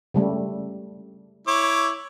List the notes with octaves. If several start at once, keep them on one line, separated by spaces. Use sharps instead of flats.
C#3 G3 A3
E4 C#5 D6